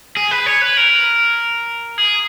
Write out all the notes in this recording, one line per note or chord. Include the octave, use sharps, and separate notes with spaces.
G#4
B4
C#5
B4
A#4
G#4